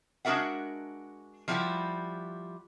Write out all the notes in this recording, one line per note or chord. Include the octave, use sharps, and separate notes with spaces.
G#3 D4 F#4 A#4 E5 F#5
F3 G3 E4 F#4 G4